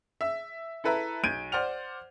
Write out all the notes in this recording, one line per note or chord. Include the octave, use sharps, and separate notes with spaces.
E5 E6
E4 A4 B4 E5 A#5
B1 G6 G#6 D7 D#7
C5 D5 F#5 F6 F7